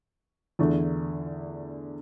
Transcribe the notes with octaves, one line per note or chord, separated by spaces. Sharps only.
E2 D3 A3